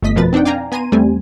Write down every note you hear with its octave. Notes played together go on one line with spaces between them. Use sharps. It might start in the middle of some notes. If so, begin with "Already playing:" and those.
G1 A3 D#5 B6
F2 B2 F3 A#4 B4 A6
C4 D4 D#4 F#5 G5
D5 F5 G5 G#5 A#5
B3 G#5 A#5 C6 D#7
E2 G3 A3 C4 G#5